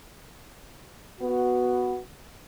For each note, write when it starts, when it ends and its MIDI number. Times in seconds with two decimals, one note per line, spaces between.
1.21 1.99 59
1.21 1.99 66